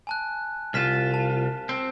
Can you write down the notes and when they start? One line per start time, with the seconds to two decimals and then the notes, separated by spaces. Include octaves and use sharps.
0.07 G#5 A5 F#6
0.74 C2 F4 F6 B6 E7
1.14 A5
1.69 C4